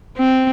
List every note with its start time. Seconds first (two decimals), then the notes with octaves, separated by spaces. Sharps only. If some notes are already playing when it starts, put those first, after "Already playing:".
0.18 C4